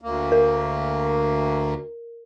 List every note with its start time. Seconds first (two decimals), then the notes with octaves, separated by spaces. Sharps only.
0.02 D2 A#3
0.32 A#4